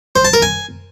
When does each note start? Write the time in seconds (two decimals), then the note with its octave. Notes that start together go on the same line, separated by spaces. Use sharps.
0.16 C5
0.25 A5
0.33 A#4
0.42 G#5